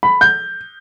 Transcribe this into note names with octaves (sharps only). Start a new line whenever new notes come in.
B5
G6